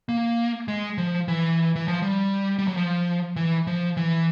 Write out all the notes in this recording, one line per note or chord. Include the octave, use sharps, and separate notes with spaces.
A#3
G#3
F3
E3
E3
F3
G3
G3
F#3
F3
E3
F3
E3